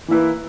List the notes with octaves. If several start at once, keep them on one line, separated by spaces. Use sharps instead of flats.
E3 A#3 E4 B4